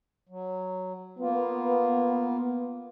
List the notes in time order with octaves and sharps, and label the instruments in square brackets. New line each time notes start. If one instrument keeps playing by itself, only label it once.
[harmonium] F#3
[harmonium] A#3 F4 [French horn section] B3